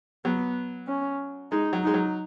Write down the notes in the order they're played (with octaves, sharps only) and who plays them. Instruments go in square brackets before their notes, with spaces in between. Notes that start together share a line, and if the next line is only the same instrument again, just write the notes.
[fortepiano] F#3 [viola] B3
[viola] C#4
[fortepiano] G#3 [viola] D#4
[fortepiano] F#3
[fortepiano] G#3 [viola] D#4
[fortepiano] F#3